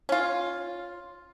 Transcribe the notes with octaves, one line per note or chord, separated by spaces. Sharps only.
C#4 F4